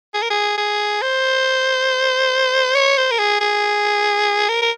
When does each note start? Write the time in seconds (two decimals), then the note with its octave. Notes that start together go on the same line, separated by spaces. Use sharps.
0.14 G#4
0.22 A#4
0.30 G#4
0.58 G#4
1.02 C5
2.75 C#5
2.97 C5
3.11 A#4
3.18 G#4
3.40 G#4
4.49 A#4
4.62 A#4